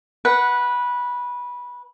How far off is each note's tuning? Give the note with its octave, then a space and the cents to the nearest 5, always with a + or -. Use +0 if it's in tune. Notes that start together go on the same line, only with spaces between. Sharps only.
B4 -15 F#5 +0